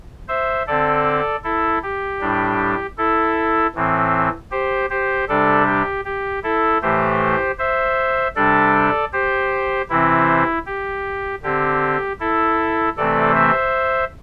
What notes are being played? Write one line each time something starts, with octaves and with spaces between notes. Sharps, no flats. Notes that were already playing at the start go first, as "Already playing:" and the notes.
C5 E5
D3 C4 A4 D5
E4 A4
G4
A2 G3 D4
E4 A4
A2 E3 C4
G4 C5
G4 C5
C3 G3 D4 A4 D5
G4
G4
E4 A4
A2 E3 A3 G4 C5
C5 E5
C3 G3 D4 A4 D5
G4 C5
C3 E3 C4 E4
G4
D3 C4 G4
E4 A4
C3 E3 A3 C4 A4 D5
C5 E5